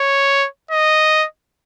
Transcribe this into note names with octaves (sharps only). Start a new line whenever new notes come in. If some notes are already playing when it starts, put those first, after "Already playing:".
Already playing: C#5
D#5